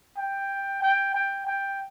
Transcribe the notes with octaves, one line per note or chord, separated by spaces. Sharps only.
G5
G5
G5
G5